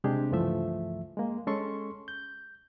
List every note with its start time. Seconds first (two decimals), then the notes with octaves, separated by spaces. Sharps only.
0.04 C3 G3 G#3 D4 G4 G#4
0.31 C#2 G2 E3 F3 A3 E5
1.17 G#3 A#3
1.47 G#3 C#4 A4 C6 C#6
2.08 G6